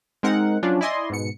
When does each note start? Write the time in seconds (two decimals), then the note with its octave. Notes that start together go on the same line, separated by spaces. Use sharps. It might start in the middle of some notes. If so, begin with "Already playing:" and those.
0.23 G#3 C4 D#4 A#4 F#5
0.63 F3 F#3 C#4 D4 F4
0.81 E4 D5 D#5 G#5 C6
1.10 G#2 B2 C#7